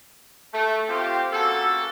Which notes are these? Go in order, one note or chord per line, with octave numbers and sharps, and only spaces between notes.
A3
C4 F4 G4
C#3 A#3 F#4 A4